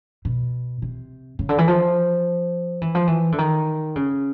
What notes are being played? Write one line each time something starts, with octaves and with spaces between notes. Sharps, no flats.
B2
C3
C#3
D3
E3
F3
E3
F3
E3
D3
D#3
C#3